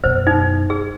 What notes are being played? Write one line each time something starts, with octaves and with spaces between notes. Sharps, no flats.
F#2 B2 C5
D#4
G#4